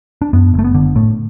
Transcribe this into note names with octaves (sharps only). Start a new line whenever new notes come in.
D4
F#2 B3
F#1 A3
B3
D3
A2 A3